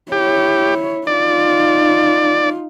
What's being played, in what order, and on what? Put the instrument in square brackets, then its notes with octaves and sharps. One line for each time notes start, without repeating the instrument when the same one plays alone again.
[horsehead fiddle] E4 C#5 [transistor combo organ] G4
[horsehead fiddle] D#4 F4 [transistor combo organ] D5